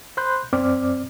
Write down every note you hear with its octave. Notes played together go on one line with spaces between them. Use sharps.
C5 B5 C6 F#6 G6
F#2 C4 D5 D6 F6